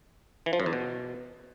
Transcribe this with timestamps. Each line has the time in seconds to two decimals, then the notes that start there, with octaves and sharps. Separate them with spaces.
0.46 E3
0.53 F3
0.60 F#2
0.66 E2
0.73 B2